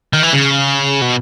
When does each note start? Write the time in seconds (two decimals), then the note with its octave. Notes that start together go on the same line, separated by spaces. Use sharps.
0.13 D#3
0.23 E3
0.33 C#3
1.02 B2